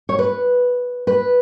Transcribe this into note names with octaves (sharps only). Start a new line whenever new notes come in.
C#5
B4
B4